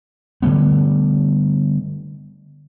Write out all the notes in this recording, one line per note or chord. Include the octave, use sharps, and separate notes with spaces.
D3 G3 A3 B3